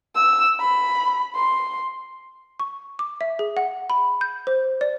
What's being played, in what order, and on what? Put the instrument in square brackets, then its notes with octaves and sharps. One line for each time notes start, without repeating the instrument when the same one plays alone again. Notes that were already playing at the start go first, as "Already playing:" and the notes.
[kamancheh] E6
B5
C6
[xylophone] C#6
D6
E5
G#4
F#5
B5
G6
C5
D5